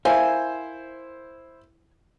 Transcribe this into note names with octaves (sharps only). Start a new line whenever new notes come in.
E4 A#4 C5 E5 F5 G#5